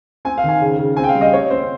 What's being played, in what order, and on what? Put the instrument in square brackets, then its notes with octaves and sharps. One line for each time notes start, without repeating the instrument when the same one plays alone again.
[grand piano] C4 G#5
F5
D#3 G#5
C#3
C#3
C4 G#5
G5
F5
G3
D#5
C4 C#5
C4 C5